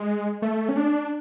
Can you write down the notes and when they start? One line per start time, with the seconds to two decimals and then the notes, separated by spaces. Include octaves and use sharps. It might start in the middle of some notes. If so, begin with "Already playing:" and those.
Already playing: G#3
0.42 A3
0.69 C#4
0.77 D4